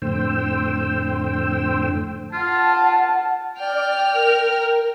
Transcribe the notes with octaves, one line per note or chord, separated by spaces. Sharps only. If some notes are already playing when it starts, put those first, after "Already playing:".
F2 A2 D3 C5 G5 E6
F4 F#5 A5
D5 G5 F6
A#4